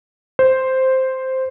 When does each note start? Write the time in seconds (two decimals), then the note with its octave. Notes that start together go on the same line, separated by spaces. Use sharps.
0.39 C5